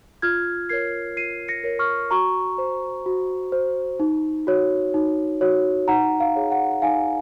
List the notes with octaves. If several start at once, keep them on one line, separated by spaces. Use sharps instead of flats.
F4 F6 G#6
A#4 C#5 G#6 C7
F4 C7 D#7
A#6 C#7
A#4 C#5
C#6 F6
F#4 A#5 C#6
C5
F#4
C5
D#4
F#4 C#5
D#4
F#4 C#5
D#4 F#5 A#5
F5
G#4 C#5
F#5
D#4 F5 G#5